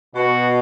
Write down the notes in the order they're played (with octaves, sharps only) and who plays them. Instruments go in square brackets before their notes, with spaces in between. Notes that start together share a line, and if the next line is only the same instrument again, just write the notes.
[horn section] B2 [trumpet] F#4